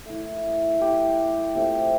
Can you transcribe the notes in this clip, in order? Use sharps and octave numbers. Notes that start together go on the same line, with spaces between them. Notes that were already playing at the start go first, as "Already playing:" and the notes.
A3 E4
G4
A3 C4 F4 G4